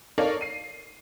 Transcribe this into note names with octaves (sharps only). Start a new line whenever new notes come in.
D#4 A4 A#4 C#5 D5 F5
C7 D#7